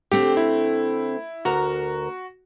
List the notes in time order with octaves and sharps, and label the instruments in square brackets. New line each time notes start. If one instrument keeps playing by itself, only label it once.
[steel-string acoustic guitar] D3 A3 C4 [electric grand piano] G4
[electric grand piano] E4
[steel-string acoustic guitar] D2 A#4 A#5 [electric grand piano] F#4